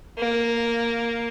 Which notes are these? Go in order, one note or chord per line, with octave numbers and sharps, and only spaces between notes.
A#3